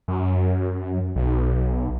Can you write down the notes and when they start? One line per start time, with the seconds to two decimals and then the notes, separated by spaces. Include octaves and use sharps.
0.08 F#2
1.16 B1